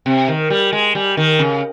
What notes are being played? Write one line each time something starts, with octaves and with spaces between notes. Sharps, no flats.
C3
D#3
G3
G#3
G3
D#3
C#3